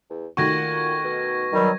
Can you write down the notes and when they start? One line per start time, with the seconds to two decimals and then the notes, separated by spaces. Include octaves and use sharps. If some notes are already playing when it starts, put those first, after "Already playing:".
0.10 E2
0.37 A#2 D#3 A3 F#4 C#6 G#6 A#6
1.04 B2
1.53 D#3 F#3 G3